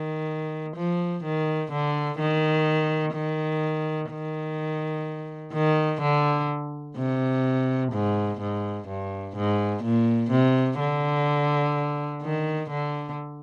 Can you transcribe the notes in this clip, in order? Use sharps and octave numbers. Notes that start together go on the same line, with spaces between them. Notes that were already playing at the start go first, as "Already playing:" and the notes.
Already playing: D#3
F3
D#3
D3
D#3
D#3
D#3
D#3
D3
C3
G#2
G#2
G2
G#2
A#2
C3
D3
D#3
D3